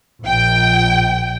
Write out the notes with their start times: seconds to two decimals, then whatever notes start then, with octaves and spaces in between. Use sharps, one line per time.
0.23 A#1 G5